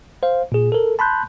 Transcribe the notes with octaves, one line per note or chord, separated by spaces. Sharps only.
C5 F5
A#2 G#4
A4 A#4
A5 B5 C6 F#6 G6